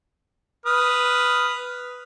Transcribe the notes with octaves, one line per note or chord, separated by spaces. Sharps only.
B4 D#6 F6